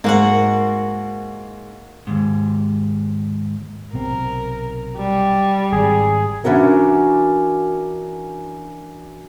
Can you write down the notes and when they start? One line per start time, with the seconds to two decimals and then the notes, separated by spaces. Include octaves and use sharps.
0.04 G#2 A#3 F#4 F#5
2.07 D#2 G#2
3.93 B1 C3 C4 A#4
4.98 G3
5.73 G#1 G#4
6.44 E3 C#4 D4 F#4 A#4